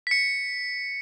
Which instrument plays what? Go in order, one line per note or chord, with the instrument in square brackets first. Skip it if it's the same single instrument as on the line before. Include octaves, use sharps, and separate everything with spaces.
[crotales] B6 C#7